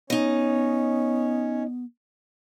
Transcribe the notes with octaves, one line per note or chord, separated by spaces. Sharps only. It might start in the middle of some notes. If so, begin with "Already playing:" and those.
B3 C#4 D#4 C#5 D#5